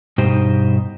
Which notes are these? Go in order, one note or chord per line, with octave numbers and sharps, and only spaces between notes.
G2 B2 D#4 G4 C5